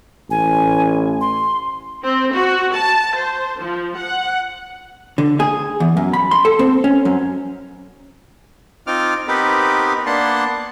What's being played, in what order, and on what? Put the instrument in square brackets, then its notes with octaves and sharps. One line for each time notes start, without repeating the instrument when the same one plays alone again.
[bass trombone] A1 [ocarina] G#5
[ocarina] C6
[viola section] C4
F#4
A5
C5
F3
F#5
[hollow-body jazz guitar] D3
G#4
E2
F#2
B5
C6
A4
C4
C#4
F#2
[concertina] C4 D#4 F4 D6 F6
B3 C4 D#4 G4 A#4 B4
A#3 B3 D4 F#5 A5 C6